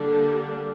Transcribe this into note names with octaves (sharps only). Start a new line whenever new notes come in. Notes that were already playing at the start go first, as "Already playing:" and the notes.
Already playing: D3 G3 A#3 D4